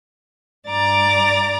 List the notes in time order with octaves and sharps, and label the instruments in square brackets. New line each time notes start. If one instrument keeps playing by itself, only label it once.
[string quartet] G2 D5 A#5 D6 A6